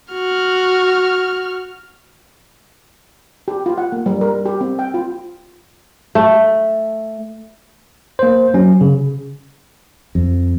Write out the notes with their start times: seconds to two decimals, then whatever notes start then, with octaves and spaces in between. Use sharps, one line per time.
0.12 F#4 F6
3.48 G4
3.66 F4
3.78 F#5
3.92 A#3
4.06 G3
4.21 A#4
4.45 G4
4.61 C4
4.79 G5
4.94 F4
6.15 A3
8.19 A#3 C5
8.54 F#3 C#4
8.81 C#3
10.15 F2